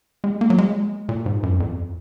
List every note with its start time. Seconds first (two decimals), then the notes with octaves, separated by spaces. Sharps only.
0.24 G#3
0.41 A#3
0.50 F#3
0.58 G#3
1.09 A#2
1.26 G#2
1.43 F#2
1.60 F2